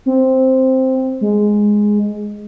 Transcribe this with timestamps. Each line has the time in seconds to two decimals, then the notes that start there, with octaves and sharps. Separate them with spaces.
0.06 C4
1.21 G#3